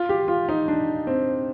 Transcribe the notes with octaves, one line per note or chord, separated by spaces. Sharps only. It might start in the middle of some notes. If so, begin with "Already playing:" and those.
Already playing: F4
G4
F4
D#4
D4
C4